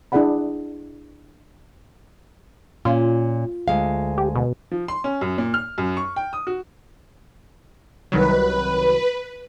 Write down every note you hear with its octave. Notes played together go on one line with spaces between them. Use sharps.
D4 E4 G#4 D5 F#5 B5
A#2 C#4 F4
D2 G#3 F5
G4
B2
F3
C6
C#4
F#2
A#2
F6
F#2
C#6
G5
D#6
F#4
C2 D#3 F#3 B4